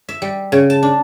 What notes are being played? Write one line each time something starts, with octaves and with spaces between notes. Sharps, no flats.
E5
G3
C#3
A5
D4